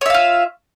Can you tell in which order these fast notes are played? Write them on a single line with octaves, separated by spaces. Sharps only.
C#5 E5 F5 F4